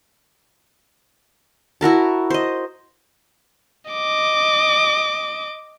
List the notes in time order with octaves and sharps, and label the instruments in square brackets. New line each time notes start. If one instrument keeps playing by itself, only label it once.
[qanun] E4 F#4 A#4 A5
C5 D#5
[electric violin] D#5 D6